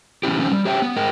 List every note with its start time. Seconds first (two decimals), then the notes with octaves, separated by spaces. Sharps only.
0.23 E3 B3 C#4 E4 G4
0.39 E3 A3 C4 C#4 D#4
0.51 G3
0.65 G4 C#5 E5 F5 G5
0.82 B3
0.96 G#4 A#4 D#5 G5